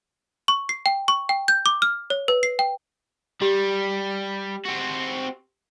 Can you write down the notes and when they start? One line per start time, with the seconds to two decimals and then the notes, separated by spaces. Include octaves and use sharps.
0.48 C#6
0.69 C7
0.86 G5
1.08 C#6
1.29 G5
1.48 G6
1.66 D6
1.82 F6
2.10 C#5
2.28 B4
2.43 C7
2.59 G5
3.42 G3 G4
4.65 C4 F#4